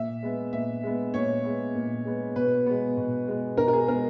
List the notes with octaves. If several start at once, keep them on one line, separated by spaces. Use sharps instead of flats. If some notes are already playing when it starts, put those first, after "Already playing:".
Already playing: A#2 E5
G#3 B3
A#2 E5
G#3 B3
A#2 C#5
G#3 B3
A#2
G#3 B3
B2 B4
G#3 B3
B2
G#3 B3
B2 A#4
A#4
G#4
G#3 B3 A#4